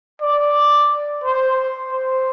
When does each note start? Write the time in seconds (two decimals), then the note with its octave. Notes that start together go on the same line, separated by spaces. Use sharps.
0.22 D5
1.24 C5
1.92 C5